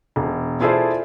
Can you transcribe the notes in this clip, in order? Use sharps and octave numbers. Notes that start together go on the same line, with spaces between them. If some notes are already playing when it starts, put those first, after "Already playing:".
E1
E4 F4 G#4 A4 C5 D5